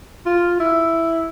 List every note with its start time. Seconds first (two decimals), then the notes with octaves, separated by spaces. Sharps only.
0.26 F4
0.60 E4